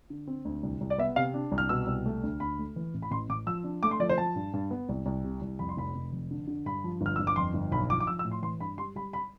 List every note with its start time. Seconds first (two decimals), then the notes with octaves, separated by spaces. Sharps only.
0.10 D3
0.27 C4
0.45 D2
0.63 C2
0.81 C2
0.90 D5
0.98 B3 E5
1.16 C3 F5
1.34 D4
1.52 C2
1.58 F6
1.69 B2 E6
1.87 C2
2.06 A3
2.23 D2
2.40 D2 B5
2.59 A3
2.76 E3
2.94 A1
3.02 B5
3.11 A1 C6
3.29 A1 D6
3.46 F3 E6
3.64 D4
3.83 A3 D6
3.91 C6
4.00 F3 D5
4.09 C5
4.18 F3 A5
4.36 G2
4.54 G2
4.71 B3
4.89 C2
5.06 C2
5.24 C3
5.42 C2
5.59 F2 B5
5.69 C6
5.77 F1 B5
5.95 F1
6.13 F2
6.31 D3
6.47 D3
6.66 G2 B5
6.84 F3
7.01 G1 F6
7.16 G1 E6
7.27 D6
7.36 F2 C6
7.54 G1
7.72 B1 B5
7.90 F3 D6
8.00 D6
8.07 F3 E6
8.19 E6
8.25 A2
8.31 C6
8.42 E3 C6
8.60 G2 B5
8.78 G3 C6
8.95 G3 B5
9.13 B5